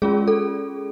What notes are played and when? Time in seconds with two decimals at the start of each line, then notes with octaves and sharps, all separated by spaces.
0.02 G#3 C#4 F4 G#4
0.28 A4